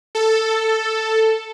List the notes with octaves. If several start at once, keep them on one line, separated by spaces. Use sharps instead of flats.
A4